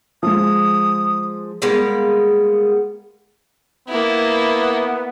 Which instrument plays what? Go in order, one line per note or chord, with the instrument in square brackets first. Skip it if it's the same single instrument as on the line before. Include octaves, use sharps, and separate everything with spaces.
[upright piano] F3 G#3 [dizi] D#6
[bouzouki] G3 G#3 A#3 B3
[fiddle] A#3 E4 [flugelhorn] B3